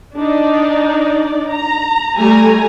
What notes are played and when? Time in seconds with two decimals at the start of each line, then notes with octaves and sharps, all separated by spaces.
0.16 D4 D#4 D5
1.49 A#5
2.17 G3 A3 G#5 A#5